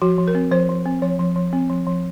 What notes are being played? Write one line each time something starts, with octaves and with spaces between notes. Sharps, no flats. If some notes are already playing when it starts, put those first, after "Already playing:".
F3 F#4
F3
A#4
C4
F3 C5
F3
C4
F3 C#5
F3
F3
C4
F3
F3